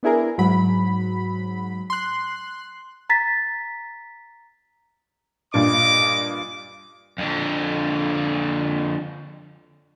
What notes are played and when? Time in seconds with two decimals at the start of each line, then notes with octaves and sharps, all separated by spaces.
0.03 B3 D4 E4 G#4 A#4
0.38 G#2 F#3 B5
1.90 C6 F#6
3.10 A#5 A6 B6
5.54 G2 A#2 D4 D#5 D6
7.18 F2 D3